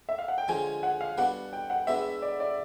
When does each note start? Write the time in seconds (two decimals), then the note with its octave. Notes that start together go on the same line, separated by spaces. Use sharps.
0.09 E5
0.19 F5
0.28 F#5
0.38 G5
0.48 D3 F3 G#3 C#4 F4 G#5
0.83 F#5
1.01 F5
1.18 G3 B3 D4 F#4 F#5
1.53 G5
1.70 F#5
1.87 G#3 B3 D4 F#4 B4 E5
2.22 D5
2.40 D5